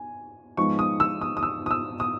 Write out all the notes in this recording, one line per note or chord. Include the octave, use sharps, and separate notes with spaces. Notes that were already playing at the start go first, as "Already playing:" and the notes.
Already playing: G#5
G#2 F3 G#3 B3 D#4 C#6
D#6
E6
D#6
D#6
E6
D#6
E6
D#6